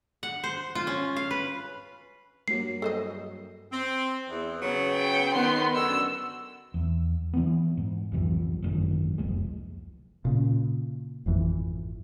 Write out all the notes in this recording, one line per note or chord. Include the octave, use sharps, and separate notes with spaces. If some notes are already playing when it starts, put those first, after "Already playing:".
F#5
C5
F4
C#4
F5
B4
G2 F#3 A#3 C7
A4 C5 D#5
C4
E2
C#3 F#3 B3
G5
D#3 B3 C6
F#2 D3 F#4 E6
E2
E3 B3
G#2
B1 F2 E3
G#1 F#2 D#3
F1 C#2 G#3
A#2 C#3
G#1 F2 E3